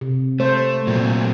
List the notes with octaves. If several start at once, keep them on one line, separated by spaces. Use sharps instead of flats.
C3
A3 C5
A#2 F#3 A3 C4